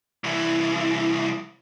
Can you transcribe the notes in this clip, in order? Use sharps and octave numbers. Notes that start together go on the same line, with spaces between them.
C2 E3